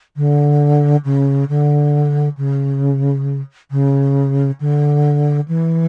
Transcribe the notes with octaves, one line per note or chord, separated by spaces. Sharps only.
D3
C#3
D3
C#3
C#3
D3
E3